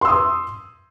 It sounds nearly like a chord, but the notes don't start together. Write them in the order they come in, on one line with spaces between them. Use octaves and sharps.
C6 E6 D#6